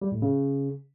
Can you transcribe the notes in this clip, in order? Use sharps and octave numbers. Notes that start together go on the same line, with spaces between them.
G3
A2
C#3